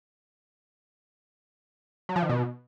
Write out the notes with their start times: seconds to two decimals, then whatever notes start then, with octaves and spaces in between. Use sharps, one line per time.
2.09 F#3
2.16 F3
2.23 D#3
2.29 B2